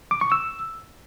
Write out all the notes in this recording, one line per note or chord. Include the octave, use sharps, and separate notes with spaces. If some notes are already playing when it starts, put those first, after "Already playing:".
D6
C#6
E6